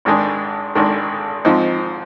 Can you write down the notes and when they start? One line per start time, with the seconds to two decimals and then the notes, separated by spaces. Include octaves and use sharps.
0.05 G#1 G#2 D#3 G#3 D4
0.75 G#1 G#2 D#3 G#3 D4
1.45 G#2 F3 C4 D#4